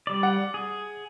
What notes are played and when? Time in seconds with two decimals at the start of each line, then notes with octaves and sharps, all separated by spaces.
0.07 G3 D5
0.23 F#5
0.54 G#4